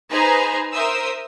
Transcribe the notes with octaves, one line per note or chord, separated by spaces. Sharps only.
D#4 G#4 B4 C5 G#5 A#5
A#4 C5 E5 D#6 E6